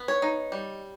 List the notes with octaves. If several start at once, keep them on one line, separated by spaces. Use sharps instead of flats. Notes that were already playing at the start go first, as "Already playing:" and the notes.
Already playing: B3
C#5
D#4
G3